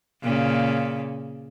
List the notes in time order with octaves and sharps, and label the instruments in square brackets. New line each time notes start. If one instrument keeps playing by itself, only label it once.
[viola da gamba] A#2 C#3